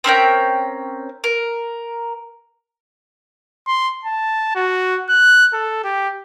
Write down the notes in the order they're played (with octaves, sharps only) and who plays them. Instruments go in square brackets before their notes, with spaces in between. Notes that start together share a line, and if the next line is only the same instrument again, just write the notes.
[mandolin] C4 C#4 A#4 G5
A#4
[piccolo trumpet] C6
A5
F#4
F#6
A4
G4